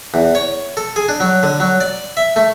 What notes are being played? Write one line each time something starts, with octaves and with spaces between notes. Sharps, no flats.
E2
C#5
A4
G#4
D4
F#3
D3
F#3
D5
E5
A3